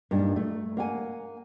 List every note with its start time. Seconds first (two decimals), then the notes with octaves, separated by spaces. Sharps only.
0.11 G2 A#2 D#4
0.36 A3
0.77 A#3 F#5 G#5